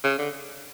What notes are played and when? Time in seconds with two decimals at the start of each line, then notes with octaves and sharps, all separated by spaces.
0.04 C#3
0.18 D3